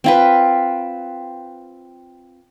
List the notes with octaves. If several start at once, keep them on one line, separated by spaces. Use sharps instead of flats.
C4 F4 B4